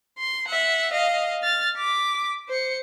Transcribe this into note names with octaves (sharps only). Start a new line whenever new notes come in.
C6
E5 F#5
D#5 F5
F6 A6
D6 B6
C5 C#7